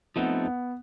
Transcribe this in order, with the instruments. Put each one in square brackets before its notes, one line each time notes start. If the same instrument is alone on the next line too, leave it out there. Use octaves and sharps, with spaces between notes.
[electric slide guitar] F3 A3 C4 D#4 [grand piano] B3
[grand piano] B3